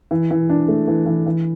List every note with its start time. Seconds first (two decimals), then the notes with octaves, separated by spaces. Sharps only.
0.11 E3
0.31 E3
0.49 D4
0.68 A3
0.87 E3
1.06 E3
1.26 E3